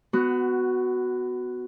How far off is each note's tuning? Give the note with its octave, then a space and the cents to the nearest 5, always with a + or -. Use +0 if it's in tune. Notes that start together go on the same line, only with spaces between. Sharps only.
B3 +20 F#4 +0